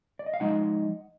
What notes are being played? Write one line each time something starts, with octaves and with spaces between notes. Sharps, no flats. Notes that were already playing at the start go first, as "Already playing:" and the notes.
D5
D#5
F5
F3 G#3 D#4 D#5 F#5